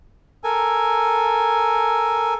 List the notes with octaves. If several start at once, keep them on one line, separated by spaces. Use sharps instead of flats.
A4 A#4 G#5